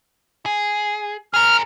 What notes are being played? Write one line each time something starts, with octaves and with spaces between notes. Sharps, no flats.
G#4
G#4 A#4 F6